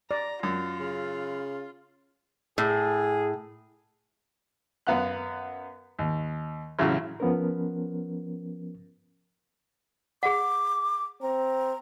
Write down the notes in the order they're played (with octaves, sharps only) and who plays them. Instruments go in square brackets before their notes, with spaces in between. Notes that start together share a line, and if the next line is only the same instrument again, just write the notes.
[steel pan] D5 [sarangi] A#5
[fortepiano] F#2 [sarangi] F4
[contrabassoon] C#3
[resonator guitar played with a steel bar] A2 [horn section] G#4
[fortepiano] F#2 B3 F5 F#5 F#6
D#2
A1 C#3 F#3 E4
[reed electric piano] F3 B3 C#4 A#4
[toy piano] G#4 F#5 [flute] D6
[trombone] C4 [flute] A#5